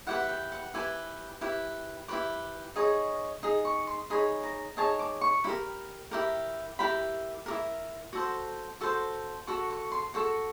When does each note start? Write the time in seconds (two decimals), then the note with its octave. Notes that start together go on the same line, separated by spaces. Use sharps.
0.07 E4 G4 B4 F#5
0.29 G5
0.52 F#5
0.74 E4 G4 B4 G#5
1.41 E4 G4 B4
2.08 E4 G4 B4 D6
2.76 D#4 G#4 C#5
3.43 D#4 G#4
3.65 C#6
3.87 C6
4.10 D#4 G#4 C#5 B5
4.43 A#5
4.77 D#4 G#4 C#5 A5
4.99 D6
5.21 C#6
5.44 E4 B5
5.47 G4 A#4
6.11 E4 G4 A#4
6.79 E4 G4 A#4 B5
7.46 G4 A#4
7.51 E4
8.13 F#4 A4 C5
8.81 F#4 A4 C5
9.47 F#4 A4 C#6
9.70 C#6
9.92 C6
10.14 F#4 A4 C#6